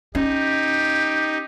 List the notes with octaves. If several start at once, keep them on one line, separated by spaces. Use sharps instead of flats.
C#4 D#4 G4